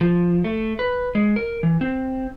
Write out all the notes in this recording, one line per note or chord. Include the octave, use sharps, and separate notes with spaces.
F3
A3
B4
G#3
A#4
E3
C4